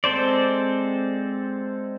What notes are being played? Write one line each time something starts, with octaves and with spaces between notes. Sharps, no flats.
G#3 C4 A4 C5 D5